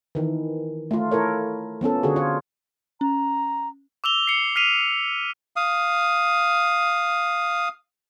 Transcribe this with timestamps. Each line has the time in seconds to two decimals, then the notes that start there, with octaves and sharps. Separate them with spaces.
0.15 D#3 E3
0.91 A3 F4
1.11 E4 A4 A#4 C#5
1.81 F3 B3 C#4 A4
2.03 D3 F#4 G#4
2.16 F4 C#5
3.01 C#4 A#5
4.04 D6 E6 F7 G7
4.27 C7 C#7
4.56 F6 B6 C7 D#7 F7
5.56 F5 D#6